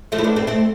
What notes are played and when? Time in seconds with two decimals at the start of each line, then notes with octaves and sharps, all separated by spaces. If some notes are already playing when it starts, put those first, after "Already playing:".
0.12 F3 A3
0.18 E4
0.24 B3 D4
0.36 A3 C4
0.47 A3 C4